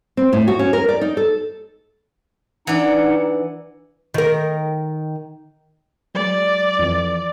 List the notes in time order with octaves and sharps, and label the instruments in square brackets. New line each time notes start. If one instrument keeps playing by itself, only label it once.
[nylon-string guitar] C4
A2
F#4
C#4
A#4
D5
D#4
A4
[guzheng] E3 D4 [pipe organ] D#4 F#5
[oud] D#3 A#4
[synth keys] F#3 G#3 [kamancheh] D5
[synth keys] F2 E3